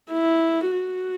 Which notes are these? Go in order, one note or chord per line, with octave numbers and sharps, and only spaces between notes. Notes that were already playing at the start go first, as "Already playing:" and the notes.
E4
F#4